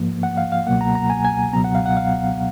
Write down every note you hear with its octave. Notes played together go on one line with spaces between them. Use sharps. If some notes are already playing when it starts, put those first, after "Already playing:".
Already playing: G#2 F3 A#3
F#5
F5
F5
C#2 B2 F#3 A#3 F#5
A#5
A#5
G#5
G#5
C#2 B2 F#3 B3 A#5
F#5
F5
F#5
F5